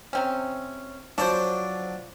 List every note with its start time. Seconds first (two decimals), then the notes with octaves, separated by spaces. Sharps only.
0.13 C3 C4 C#4
1.18 F3 F#3 D4 C5 D5